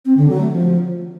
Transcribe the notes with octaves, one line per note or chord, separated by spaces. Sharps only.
C4
D3
F#3
A3
F3